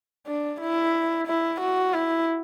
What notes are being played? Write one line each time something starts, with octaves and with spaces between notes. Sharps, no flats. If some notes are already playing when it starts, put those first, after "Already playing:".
D4
E4
E4
F#4
E4